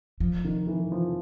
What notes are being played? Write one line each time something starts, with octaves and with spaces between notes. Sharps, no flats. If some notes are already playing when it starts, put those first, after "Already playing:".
F3
D#3
E3
F3